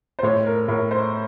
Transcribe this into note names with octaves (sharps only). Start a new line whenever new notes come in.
C5
A2 C#5
A#4
A2 A#4
C5